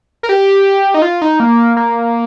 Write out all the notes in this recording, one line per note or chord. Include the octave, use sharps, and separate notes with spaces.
A#4
G4
D#4
F4
D#4
A#3
A#3